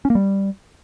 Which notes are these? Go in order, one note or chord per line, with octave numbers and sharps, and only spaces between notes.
C#4
A#3
G3